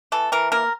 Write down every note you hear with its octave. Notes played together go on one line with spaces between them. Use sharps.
E3 A4
E3 A#4
A#3 A#4